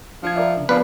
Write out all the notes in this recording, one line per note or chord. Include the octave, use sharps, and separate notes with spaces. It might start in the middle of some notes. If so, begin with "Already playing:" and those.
F3 D4 F4 G#6
A#4 D5 E5
C#3 D4
F3 B3 D4 B4 D5